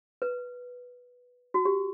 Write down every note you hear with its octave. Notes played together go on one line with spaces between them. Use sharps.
B4
F#4
G4